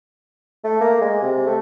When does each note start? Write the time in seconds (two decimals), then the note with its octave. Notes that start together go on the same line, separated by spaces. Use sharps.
0.64 A3
0.81 A#3
1.01 G#3
1.22 C3
1.46 A3